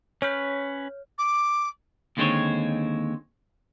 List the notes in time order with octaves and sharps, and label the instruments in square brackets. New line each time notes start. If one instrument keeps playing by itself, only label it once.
[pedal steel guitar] C#4 B4 [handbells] C#5 F6 G6
[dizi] D6
[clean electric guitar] D#2 D3 G#3 C4 D#4 C#5